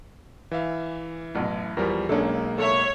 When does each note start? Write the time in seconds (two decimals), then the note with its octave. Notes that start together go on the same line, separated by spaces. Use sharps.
0.51 E3 E5 F5
1.35 A1 F#2 B2
1.77 E2 F3 G3 A#4
2.09 B1 G#3 A#3 C#4 D4 A4
2.58 A4 C#5 E5